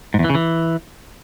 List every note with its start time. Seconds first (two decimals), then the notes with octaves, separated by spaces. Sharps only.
0.14 G#2
0.19 E2
0.24 E3
0.30 C#3
0.35 E3